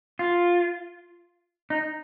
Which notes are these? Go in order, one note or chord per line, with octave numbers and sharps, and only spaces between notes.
F4
D#4